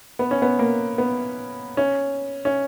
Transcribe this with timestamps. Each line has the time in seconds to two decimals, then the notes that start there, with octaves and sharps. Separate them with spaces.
0.19 B3
0.31 C#4
0.42 B3
0.59 A#3
0.98 B3
1.77 C#4
2.45 C#4